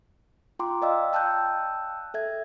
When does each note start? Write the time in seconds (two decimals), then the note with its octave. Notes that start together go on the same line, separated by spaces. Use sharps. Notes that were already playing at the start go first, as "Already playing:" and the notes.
0.59 F4 G5 A#5 C6 D6
0.82 D5 D#5 F5 G5 E6
1.13 G5 A5 E6 F#6 G6
2.14 A4 E5 G#6